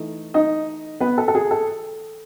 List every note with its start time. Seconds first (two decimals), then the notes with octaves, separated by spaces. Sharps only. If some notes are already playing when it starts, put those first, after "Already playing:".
Already playing: E3 A3 D#4
0.34 D#4 D#5
1.00 B3 B4
1.18 A4
1.28 A4
1.35 G#4
1.51 A4